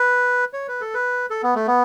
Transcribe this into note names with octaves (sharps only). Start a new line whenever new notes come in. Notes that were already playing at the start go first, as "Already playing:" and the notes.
Already playing: B4
C#5
B4
A4
B4
A4
B3
A3
B3